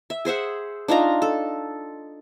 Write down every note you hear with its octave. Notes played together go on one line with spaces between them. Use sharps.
E5
G#4 C5 E5 F#5
D4 D#4 F4 A#5
A4